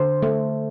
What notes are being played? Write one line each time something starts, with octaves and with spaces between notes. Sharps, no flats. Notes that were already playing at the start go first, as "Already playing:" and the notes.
Already playing: D3 C5
A3